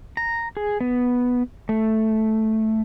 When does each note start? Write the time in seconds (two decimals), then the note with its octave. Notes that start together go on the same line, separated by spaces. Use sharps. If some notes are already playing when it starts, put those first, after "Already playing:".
0.17 A#5
0.57 G#4
0.81 B3
1.69 A3